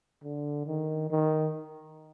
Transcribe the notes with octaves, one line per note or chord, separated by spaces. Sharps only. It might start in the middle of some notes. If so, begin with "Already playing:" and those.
D3
D#3
D#3